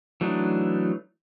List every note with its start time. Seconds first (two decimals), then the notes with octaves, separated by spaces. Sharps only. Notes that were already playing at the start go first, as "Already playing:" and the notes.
0.21 E3 F#3 A3 D4 D#4